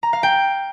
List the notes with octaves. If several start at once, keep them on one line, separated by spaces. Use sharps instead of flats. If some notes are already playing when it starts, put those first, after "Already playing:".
A#5
F5
G5